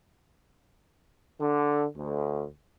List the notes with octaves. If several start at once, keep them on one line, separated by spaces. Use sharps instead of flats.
D3
D2